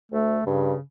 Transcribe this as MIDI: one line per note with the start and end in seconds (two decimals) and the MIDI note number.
0.12 0.38 38
0.12 0.43 57
0.46 0.73 43
0.46 0.80 49